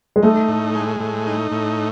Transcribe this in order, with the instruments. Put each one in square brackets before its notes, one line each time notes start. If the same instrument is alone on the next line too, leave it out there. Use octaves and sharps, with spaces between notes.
[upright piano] G#3
[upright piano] A3 [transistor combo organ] D#4
[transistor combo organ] A2
G#3
A2
D#4
A2